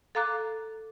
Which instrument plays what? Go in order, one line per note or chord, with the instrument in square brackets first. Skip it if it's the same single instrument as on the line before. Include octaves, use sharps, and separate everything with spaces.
[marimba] A4 F5 A#5 D6 F#6